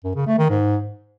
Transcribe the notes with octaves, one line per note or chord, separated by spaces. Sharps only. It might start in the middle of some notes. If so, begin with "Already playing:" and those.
F#2
C#3
A3
D#3
G#2